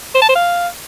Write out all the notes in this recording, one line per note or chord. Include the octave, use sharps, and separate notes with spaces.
C5
A5
C5
F5